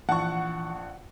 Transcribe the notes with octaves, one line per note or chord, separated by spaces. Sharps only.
A#1 E3 F#5 A5 C#6